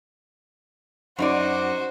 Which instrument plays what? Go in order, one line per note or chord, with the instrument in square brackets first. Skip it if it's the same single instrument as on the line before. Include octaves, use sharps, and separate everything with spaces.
[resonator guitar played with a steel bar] F#2 D#4 D5 [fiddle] F#4 C5